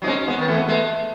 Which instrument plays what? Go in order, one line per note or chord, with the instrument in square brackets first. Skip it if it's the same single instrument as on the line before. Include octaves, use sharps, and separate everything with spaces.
[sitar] F#3 [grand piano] D#4
[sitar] G#3 [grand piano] C#4
[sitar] G#3 [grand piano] B3
[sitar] D#3
[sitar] E3 [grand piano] A3
[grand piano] B3
[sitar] G#3 [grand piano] A3